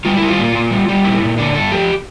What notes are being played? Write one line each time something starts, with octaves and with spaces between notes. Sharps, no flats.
G3 F4
G3 E4
F4
A#2
A#2
G3
G3
A#2 E4
A#2
D3 D4
G2 A4
F3 G4